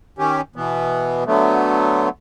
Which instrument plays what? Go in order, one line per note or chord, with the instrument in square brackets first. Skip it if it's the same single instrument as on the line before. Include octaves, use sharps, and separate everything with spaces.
[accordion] D#3 C#4 G4
B2 E3 B3
D3 F#3 A3 B3